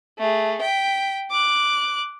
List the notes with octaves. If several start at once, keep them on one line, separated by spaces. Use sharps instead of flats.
A3 G#4
G5 B6
D6 F#6